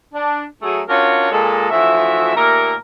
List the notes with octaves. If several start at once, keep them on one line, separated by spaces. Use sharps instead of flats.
D4
F#3 A3 G#4
C#4 D4 F4 F#4 A#4 C#5
A#2 G#3 A4
D2 E3 F3 F#4 E5
D#2 A#2 A3 A#3 A#4